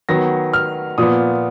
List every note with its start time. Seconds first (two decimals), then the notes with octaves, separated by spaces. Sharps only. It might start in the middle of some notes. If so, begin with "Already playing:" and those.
0.09 D#3 F#3 B3 A#6
0.53 F6
0.98 A#2 F3 B3 D#6